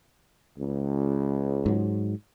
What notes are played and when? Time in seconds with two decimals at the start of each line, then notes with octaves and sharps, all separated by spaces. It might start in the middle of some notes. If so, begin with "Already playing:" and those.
0.57 C#2
1.66 G#2 F#3